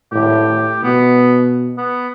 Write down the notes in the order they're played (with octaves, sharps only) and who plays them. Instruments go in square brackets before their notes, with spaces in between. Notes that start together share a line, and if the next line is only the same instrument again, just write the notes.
[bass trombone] A2 [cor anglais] G4
[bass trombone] B2 [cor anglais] B3
[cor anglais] B3